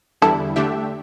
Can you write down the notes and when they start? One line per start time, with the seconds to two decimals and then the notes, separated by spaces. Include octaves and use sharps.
0.22 E2 D3 G3 E4 A4
0.56 D3 A3 D4 G4 E5